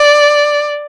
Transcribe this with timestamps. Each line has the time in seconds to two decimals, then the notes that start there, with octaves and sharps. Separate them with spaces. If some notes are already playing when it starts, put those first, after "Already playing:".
Already playing: D5